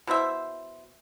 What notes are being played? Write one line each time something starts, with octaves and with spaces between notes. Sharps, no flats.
B2 E4 C5 E5